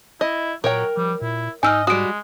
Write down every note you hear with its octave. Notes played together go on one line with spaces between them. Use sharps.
E4 D#5
A#2 F#3 A#4 C#5 G5
F3 G3
A#2 E4
G#2 D#4 D#5 G#5 E6 F6
G3 G#3 F#4 D#6 D7